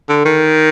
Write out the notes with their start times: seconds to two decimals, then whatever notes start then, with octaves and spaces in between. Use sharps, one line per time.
0.09 D3
0.25 D#3